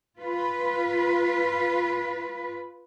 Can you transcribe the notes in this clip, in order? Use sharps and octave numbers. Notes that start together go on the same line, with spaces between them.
F4 B4